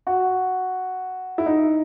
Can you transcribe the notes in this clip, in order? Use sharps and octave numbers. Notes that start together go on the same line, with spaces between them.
F#4
E4
D#4